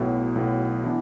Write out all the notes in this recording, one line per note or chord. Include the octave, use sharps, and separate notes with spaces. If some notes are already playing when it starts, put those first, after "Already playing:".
Already playing: B1 A2 F#3 B3
B1 A2 F#3 B3
E3 B3 D4